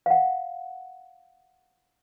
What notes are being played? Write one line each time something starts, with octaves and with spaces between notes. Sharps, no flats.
F5 F#5